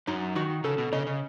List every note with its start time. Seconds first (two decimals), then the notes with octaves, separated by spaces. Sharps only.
0.07 F#2 F#3 D#4
0.35 D#3 F#4
0.64 C#3 A4
0.78 B2
0.93 C#3 D#5
1.07 C#3